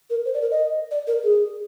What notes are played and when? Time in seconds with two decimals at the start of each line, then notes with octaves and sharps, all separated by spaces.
0.10 A#4
0.25 C5
0.34 D5
0.42 A#4
0.51 D#5
0.91 D5
1.07 A#4
1.24 G#4